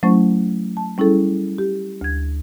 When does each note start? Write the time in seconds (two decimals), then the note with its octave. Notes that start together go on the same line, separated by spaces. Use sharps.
0.03 F#3 A3 C#4 E4 C5 C#6
0.77 A5
0.98 G3 C#4 E4 G#4 A4
1.58 G4
2.01 D2 G#6